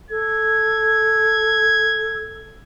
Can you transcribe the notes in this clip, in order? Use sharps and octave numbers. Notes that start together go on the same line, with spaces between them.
A4 G#6